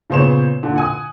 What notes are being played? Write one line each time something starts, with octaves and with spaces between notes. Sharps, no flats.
A#2 C#3 B3 C5 C#5 E7
A#2 D3
F#5 G#5 D#6